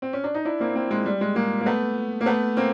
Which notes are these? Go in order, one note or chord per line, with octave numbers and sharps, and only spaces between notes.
C4
C#4
D4
D#4
D4 E4
A#3 C4
A#3 C4
G#3
G3
G#3
G#3 A#3
A#3
A3 B3
A#3
A3 B3
A#3 C4